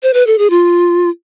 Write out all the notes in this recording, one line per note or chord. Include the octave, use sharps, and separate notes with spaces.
C5
B4
A4
G#4
F4